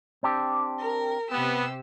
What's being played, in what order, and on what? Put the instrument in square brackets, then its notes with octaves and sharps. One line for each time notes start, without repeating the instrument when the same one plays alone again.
[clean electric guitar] C4 D4 G4
[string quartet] A#4
[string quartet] C3 G4 E6 [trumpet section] B3